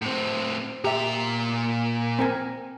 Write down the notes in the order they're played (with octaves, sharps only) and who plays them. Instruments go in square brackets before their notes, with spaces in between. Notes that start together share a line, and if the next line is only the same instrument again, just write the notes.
[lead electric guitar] A2 C4
[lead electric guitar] A#2 A#5 [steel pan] G4 E5
[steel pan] C4 A#4 G#5